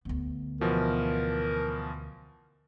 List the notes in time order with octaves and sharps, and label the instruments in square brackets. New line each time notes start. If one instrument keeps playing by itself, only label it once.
[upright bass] D2 B3
[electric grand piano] B2 E3 F3 [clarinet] A#4